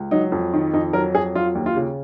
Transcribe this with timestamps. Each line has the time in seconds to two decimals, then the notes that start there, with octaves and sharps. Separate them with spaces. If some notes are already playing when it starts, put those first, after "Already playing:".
Already playing: C#2
0.11 F#3 D#4
0.32 F2
0.53 D#3
0.73 F2 D#4
0.93 F#3 A#4
1.15 F2 G#4
1.35 F#3 F4
1.55 D#2
1.66 F4
1.76 C#3